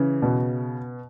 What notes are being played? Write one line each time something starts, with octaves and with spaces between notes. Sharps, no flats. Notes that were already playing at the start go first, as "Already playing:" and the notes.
Already playing: C#3 E3
B2